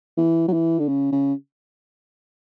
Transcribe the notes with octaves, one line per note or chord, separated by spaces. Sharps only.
E3
F#3
E3
D3
C#3
C#3